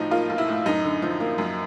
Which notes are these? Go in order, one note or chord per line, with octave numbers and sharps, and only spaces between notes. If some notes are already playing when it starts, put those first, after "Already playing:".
Already playing: B1 A2 F3 D#4
A#3 F4
B1
E4
A2
F#2 D#4
D3
F3
A#3
F#2